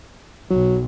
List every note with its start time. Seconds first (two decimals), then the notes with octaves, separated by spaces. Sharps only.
0.50 B1 F#3